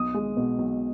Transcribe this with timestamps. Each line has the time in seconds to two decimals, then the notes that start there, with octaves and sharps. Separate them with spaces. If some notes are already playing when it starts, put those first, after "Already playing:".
Already playing: B1 D#6
0.14 G#3
0.37 B2
0.59 B1